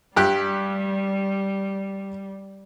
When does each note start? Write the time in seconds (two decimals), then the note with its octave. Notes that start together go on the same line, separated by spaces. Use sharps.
0.16 G2 G3 G4 F#6